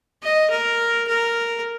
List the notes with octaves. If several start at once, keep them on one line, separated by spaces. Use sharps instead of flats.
D#5
A#4
A#4